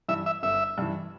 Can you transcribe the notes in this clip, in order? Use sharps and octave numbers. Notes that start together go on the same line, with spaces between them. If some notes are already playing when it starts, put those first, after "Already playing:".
G2 E3 E5
E5
G1 E5
G2 E3